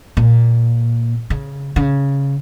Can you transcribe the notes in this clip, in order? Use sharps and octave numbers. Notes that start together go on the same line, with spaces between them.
A#2
C#3
C#3